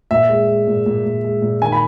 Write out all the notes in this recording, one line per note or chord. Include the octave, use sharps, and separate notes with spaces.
A#2 E5
G#3
G#3
A#2
A#2
A#2
G#3
A#2
D#3 G#5
B5